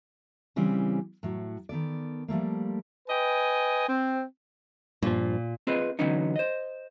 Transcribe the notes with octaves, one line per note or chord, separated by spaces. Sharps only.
C#3 E3 G3 C4 C#4
A2 F#3
D#3 B3 A4 D5
F3 G3 A3 A#3
B4 D#5 G5 G#5
C4
G2 A#2 F3
C4 F4 G#4 B4 D#5
D3 E3 F#3 B3 C#4 D#4
C5 D#5